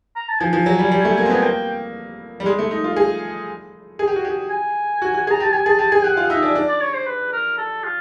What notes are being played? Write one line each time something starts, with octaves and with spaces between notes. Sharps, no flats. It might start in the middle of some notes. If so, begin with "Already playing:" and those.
A#5
A5
F3 G#5
F3
F#3
G3
G3
A3
A#3
C4
B3
A#3 G5
G3
G#3
A3
D#4
F4
G#4
G#4
G4
F#4
G4
G#5
F#4
F#4
G#4
A#5
G4 A5
G4 G#5
G#4 A5
G4 A5
G#4 G#5
G4 F#5
F4
D#4 E5
D4
D4
D5
C#5
C5
B4
A#4
A4
F4